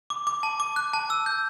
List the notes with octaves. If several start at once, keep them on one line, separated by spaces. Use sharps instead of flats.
D6
D6
A5
D6
F#6
A5
E6
G6